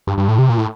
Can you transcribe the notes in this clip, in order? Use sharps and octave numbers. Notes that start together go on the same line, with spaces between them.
G2
G2
A2
C3
A#2
A2